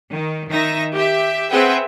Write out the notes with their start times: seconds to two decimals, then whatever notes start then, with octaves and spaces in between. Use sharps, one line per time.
0.11 D#3
0.49 D#3 D#4 E5 A#6
0.94 G4 E5
1.50 C4 G#4 B4 E5 F#5 G5